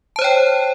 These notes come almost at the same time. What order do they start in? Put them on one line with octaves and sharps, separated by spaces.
A5 C5 C#5 G5